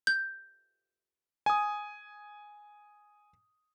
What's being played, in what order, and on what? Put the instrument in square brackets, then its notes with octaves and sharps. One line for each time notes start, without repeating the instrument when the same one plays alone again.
[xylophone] G6
[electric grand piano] G#5 D#6